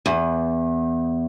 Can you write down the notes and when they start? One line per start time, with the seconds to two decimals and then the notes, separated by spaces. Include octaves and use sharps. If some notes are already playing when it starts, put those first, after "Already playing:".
0.06 E2